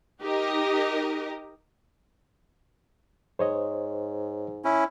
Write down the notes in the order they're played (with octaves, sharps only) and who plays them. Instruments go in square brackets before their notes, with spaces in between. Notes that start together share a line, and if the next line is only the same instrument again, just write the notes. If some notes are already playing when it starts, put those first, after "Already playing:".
[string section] D#4 G4 A#4 D#5
[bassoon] G#2 [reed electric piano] C5 C#5 D#5
[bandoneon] C#4 E4